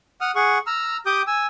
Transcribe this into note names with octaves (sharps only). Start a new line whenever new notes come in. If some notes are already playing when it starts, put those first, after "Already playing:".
F#5 D#6 F6
G#4 F#5 C#6
A#5 E6 F6
G4 D6 D#6 G6
G#5 E6